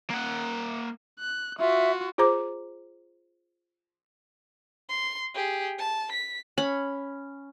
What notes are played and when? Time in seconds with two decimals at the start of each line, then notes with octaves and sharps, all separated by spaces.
0.10 A#3 F#5
1.20 F#6
1.59 F4 F#4 E5
2.18 F4 G#4 C5 A#5 D6
4.89 C6
5.35 G4 G#4
5.78 A5
6.11 B6
6.58 C#4 B5